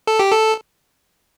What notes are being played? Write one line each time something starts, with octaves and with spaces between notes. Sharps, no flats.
A4
G4
A4